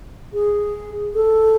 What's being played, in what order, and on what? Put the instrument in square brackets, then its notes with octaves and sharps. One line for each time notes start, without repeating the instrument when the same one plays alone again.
[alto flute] G#4
A4